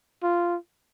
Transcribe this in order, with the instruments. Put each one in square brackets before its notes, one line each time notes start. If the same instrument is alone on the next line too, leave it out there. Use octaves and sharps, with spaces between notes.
[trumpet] F4